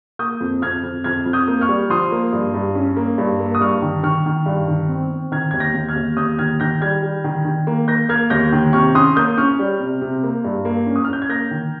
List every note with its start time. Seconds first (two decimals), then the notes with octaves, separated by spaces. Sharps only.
0.19 A#3 D#6 G6
0.41 F2
0.62 F2 F6 G#6
0.83 F2
1.04 F2 F6 G#6
1.26 F2
1.33 D#6 G6
1.48 A#3
1.61 C#6 F6
1.68 G3
1.90 F3 C6 D#6
2.12 A#3
2.32 G2
2.54 G2
2.75 C#4
2.97 A#3
3.18 G2
3.40 A#3
3.55 D#6
3.61 G2 C#6 F6
3.82 D#3
4.03 D#3 C#6 F6
4.26 D#3
4.46 G2
4.68 D#3
4.89 C4
5.10 C4
5.32 D#3 F6 G#6
5.51 D#2 G#6
5.60 G6 A#6
5.74 D#2
5.89 F6 G#6
5.96 D#2
6.17 D#2 D#6 G6
6.39 D#3 F6 G#6
6.60 D#3 G6 A#6
6.81 G3 F6 G#6
7.03 G3
7.24 D#3
7.45 D#3
7.67 A#3
7.88 A#3 G6 A#6
8.09 A#3 F6 G#6
8.30 D#2 G6 A#6
8.53 D#3
8.73 C3 C#6 F6
8.95 C#4 C6 D#6
9.16 A#3 D#6 G6
9.37 C#4 C#6 F6
9.59 G3
9.80 C3
10.02 C3
10.23 A#3
10.44 G2
10.65 A#3
10.86 C#4
10.96 D#6
11.04 F6
11.08 C#4 G6
11.22 G#6
11.29 A#3 G6 A#6
11.51 D#3